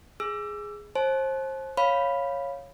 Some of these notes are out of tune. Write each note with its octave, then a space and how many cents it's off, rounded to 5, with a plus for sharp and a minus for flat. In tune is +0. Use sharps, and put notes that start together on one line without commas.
G#4 +0 E6 +25
C5 +30 A5 -35
C#5 -5 F5 +0 B5 +0